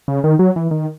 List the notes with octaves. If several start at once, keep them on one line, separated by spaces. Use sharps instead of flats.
C#3
D#3
F#3
E3
D#3